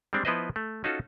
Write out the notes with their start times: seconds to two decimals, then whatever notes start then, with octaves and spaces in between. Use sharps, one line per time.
0.13 G3 G#3 C4 D4
0.25 F3 B3 E4 B4 C5 D#5
0.56 A3
0.84 C#4 D#4 F4 F#4 A4